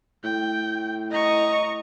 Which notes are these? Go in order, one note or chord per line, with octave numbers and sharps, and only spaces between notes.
A2 G5
D#5 A#5 C#6